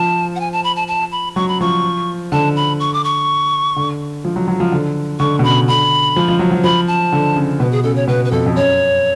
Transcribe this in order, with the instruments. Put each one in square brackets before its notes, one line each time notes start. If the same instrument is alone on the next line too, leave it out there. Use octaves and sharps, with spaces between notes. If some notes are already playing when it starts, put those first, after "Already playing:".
Already playing: [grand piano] F3 [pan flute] A5
[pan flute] F#5
G#5
A5
B5
A5
A5
B5
[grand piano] F#3 [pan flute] C#6
[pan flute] B5
[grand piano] F3 [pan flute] C#6
[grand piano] D3 [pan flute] A5
[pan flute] B5
C#6
D6
C#6
[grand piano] D3
F3
F#3
F#3
F3
D3
[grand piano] D3 [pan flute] C#6
[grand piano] B2
[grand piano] C#3 [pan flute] B5
[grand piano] D3 [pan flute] B5
[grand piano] F3
F3
F#3
F#3
[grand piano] F3 [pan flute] B5
[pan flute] A5
[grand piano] D3
C#3
[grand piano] B2 [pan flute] B4
[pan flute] G#4
[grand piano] C#3 [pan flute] A4
[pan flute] C#5
[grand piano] B2 [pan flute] B4
[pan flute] B4
[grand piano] F2 [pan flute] A4
[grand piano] F2
[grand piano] F#2 [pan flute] C#5